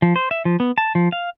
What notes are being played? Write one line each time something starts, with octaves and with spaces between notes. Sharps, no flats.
F3
C5
E5
F3
B3
A5
F3
F5